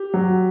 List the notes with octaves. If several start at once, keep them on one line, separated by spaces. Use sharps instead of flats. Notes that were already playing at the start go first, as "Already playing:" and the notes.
Already playing: G4
F#3